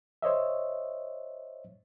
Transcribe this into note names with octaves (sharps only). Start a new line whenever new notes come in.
C5 C#5 D#5 E5